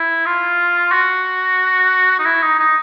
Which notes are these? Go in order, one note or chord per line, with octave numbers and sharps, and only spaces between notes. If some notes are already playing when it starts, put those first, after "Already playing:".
Already playing: E4
F4
F#4
D#4
E4
D#4
D#4